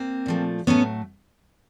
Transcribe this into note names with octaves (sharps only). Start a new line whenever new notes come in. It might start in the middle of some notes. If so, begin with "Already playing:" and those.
Already playing: A#3 C4
A#2 F3 A3
A2 F#3 A3 B3 C#4